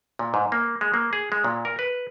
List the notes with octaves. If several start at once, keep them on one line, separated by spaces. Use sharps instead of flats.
A#2
G#2
A#3
G#3
A#3
G#4
G#3
A#2
A#4
B4